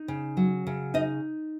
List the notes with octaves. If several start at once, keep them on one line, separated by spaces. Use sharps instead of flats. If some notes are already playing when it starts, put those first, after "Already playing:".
Already playing: D#4
C#3
F#3
C#3
D#4 D#5